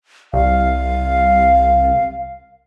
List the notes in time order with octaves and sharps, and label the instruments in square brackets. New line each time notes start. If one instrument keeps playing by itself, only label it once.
[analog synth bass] C2 [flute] F5